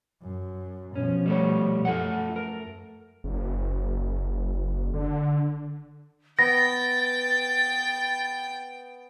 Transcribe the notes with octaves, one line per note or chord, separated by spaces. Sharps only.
F#2
B2 F3 C#4
G3 A3 C#5
F#2 A3 F4 A4 F#5
A#4
F#1
D3
B3 G5 A6 A#6